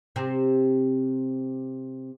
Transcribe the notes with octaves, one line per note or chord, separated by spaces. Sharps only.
C3 C4